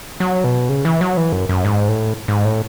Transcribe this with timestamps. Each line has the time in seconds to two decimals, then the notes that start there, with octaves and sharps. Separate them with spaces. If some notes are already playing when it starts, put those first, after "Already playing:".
0.20 F#3
0.44 B2
0.69 C#3
0.85 E3
1.01 F#3
1.17 E3
1.32 F#2
1.49 F#2
1.65 G#2
1.88 A2
2.28 G#2
2.45 A2